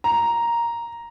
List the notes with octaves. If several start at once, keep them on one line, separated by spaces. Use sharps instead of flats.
A#5